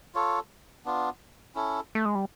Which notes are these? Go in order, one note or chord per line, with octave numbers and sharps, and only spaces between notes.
F4 A4 C#5
B3 D4 F4
C#4 E4 A4
A3
G#3
G3